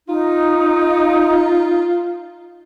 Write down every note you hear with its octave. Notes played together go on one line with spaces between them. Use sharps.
D#4 F4